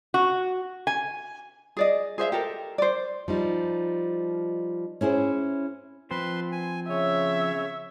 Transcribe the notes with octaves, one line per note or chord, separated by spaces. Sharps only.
F#4
G#5
G#4 D5 D#5
G#4 C5 E5 F5
G4 A4 A#4
C5 D5
F3 G3 D#4
C#4 E4 G#4 C5
F3 C4 B4 C5 C6
G#5
C#3 C#5 E5